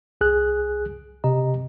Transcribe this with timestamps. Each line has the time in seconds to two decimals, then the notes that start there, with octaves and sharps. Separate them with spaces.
0.21 C2 G#4 F#6
1.24 C3 G4 D#5 A#5